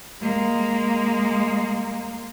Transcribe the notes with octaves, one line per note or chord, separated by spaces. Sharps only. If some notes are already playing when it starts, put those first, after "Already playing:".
G#3 A#3